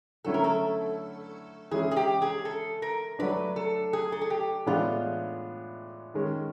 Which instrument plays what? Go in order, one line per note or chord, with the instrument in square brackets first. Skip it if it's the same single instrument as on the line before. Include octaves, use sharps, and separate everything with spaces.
[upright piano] D3 F#3 A3 C#4 E4 [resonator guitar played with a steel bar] A4
[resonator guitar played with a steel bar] A#4
A4
[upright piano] E3 G#3 C#4 E4 [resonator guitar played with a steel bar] G#4
[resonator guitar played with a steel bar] G#4
G4
G#4
A4
A#4
[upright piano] F#3 A3 D4 [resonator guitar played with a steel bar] B4
[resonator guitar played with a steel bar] A4
G#4
A4
G#4
G4
[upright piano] A2 E3 G#3 B3 D4 [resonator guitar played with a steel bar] F4
[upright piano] D#3 G#3 C#4